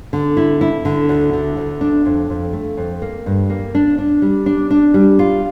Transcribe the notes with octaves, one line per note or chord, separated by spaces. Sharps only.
D3
E4
E4
D3
D2
D3
D2
D4
F2
F2
A3
F2
A#3
G2
A#3
D4
D4
G3
D4
D4
G3
F4